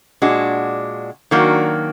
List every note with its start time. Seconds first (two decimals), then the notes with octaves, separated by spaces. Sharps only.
0.22 A#2 G#3 D4 F#4
1.31 D#3 F#3 A#3 D4 F#4